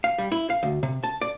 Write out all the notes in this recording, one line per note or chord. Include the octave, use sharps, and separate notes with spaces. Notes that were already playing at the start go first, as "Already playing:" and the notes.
F5
G3
E4
F5
D2
C3
A5
D5